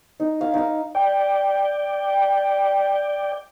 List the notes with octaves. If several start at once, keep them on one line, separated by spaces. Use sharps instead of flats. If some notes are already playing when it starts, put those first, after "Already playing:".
D#4
F5
D#4 F5
D5 G5